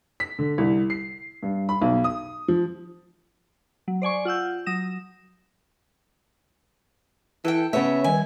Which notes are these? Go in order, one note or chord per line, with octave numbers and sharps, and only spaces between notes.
B6
D3
C2
C7
G2
B5
B1
D#6
F3
F#3
C5 D5 G#5 C#6
F4 F#5 E6 G6
F#3 D#6 A#6 E7
E3 A4 G5
C#3 B3 C#5 E5
D#3 G3 B4 G#5